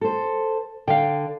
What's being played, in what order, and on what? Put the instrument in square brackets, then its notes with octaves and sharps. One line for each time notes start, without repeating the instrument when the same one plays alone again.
[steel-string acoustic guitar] A4 C5
[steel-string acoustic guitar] D3 [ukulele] F5 G5